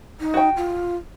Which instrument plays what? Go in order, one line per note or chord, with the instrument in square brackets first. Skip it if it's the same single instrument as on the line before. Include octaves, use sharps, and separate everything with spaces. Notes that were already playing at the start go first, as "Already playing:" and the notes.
[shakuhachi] D#4
[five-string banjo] F#4 G5
[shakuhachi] F4